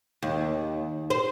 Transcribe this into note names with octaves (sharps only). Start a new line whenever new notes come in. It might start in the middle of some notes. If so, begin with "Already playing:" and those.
D#2
C5